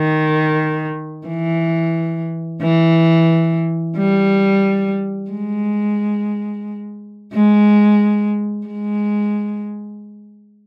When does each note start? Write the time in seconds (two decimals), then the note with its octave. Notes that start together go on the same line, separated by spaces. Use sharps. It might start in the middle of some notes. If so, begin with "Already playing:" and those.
Already playing: D#3
1.28 E3
2.62 E3
3.97 G3
5.31 G#3
7.33 G#3
8.67 G#3